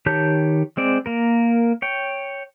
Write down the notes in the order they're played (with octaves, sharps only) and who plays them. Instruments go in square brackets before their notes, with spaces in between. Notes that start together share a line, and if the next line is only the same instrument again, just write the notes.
[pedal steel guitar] D#3 G4 C#5 A5 G6
G#3 C4 D5
A#3 A#4
C#5 G5